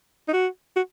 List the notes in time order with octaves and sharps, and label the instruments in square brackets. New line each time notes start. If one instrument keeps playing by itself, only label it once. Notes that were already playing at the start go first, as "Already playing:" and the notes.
[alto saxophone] D#4
F#4
F#4